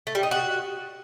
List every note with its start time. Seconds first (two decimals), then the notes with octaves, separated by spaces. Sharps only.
0.07 A3
0.15 G3
0.23 D#4
0.31 F#4